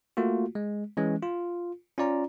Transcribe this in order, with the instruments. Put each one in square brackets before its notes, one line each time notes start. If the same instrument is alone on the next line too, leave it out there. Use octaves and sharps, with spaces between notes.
[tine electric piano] A3 A#3 F4 F#4
G#3
E3 G#3 C#4
F4
C#4 F4 D5 A#5